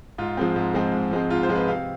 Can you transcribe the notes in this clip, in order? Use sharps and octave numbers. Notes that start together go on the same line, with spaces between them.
G#2 F4
F3 G#3 C4
G#2
F3 G#3 C4
G#2
F3 G#3 C4
G#2 F4
C5
F3 G#3 C4
B4
C3 F5